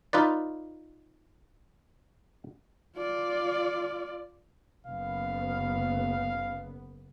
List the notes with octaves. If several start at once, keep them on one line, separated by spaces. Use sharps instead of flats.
D#4 F4 B4 D5
F4 D5
F#1 B3 F5